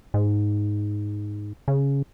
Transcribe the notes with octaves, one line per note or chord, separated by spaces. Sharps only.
G#2
C#3